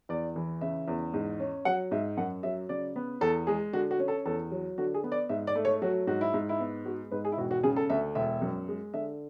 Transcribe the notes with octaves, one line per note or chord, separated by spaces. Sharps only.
E2 D5
E3
C#3 E5
E2
G#2
C#4
F#3 F#5
G#2 E5
F#2 F#5
F#3 E5
C#3 D5
B3
E2 A4
G#3 G#4
D3 F#4
F#4
C#4
A4
E2 A4
F#3
D3 F#4
G#4
B3
D5
G#2 E5
D5
A3
C#5
F#3 F#4
G#2 F#4
E4
G#2
E4
B3
G#3 F#4
G#2 B4
G#4
E4
E1 F#4
F#4
C#3 G#4
A4
D2 E5
E1 E5
F#2
G#3
D3 E5